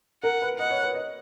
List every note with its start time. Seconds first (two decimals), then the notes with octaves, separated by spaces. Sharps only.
0.23 A#4 F#5
0.42 B4
0.59 D#5 F#5
0.71 C#5
0.83 B4
0.95 D#5